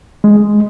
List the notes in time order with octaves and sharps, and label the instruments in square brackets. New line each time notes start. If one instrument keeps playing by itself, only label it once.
[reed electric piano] G#3